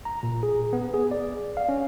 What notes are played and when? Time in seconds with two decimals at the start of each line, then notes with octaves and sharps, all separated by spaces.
0.05 A#5
0.23 A#2
0.43 G#4
0.73 B3
0.94 G#4
1.11 D5
1.57 F5
1.69 C#4